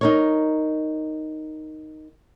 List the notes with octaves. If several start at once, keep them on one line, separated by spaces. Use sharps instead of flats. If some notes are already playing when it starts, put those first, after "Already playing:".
D#4 A#4 C#5